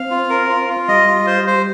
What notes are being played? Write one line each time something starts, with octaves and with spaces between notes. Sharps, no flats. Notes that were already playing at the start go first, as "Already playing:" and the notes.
Already playing: C4 F5
F4
A#4
F4
F4
G3 D#5
F4
C5
C5